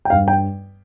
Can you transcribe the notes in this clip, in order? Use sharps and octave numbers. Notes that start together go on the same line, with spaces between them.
G5
G2 F5
G5